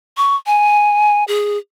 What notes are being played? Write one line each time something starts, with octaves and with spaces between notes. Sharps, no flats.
C#6
G#5
G#4